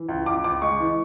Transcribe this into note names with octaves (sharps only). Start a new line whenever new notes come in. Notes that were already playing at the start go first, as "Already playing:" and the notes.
Already playing: E3
C#2
C#2 D6
C#2 D6
G#3 C#6
E3